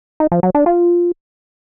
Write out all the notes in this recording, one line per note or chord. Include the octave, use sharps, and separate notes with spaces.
D#4
F3
F#3
D4
F4